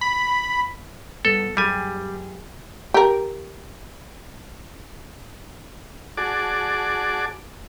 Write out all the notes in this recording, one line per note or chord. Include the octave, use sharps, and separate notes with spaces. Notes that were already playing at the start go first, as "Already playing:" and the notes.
B5
G2 B3 A4
F#2 G3 G4 G#4 G#5
G4 A#4
F#4 G#4 D5 A5 D6